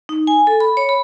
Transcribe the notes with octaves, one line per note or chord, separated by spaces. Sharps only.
D#4
G#5
A4
B5
C#5
B5